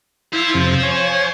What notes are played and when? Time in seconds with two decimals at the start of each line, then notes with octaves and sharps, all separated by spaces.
0.33 E4 C5 F5
0.54 F2 C3
0.83 C#5 G#5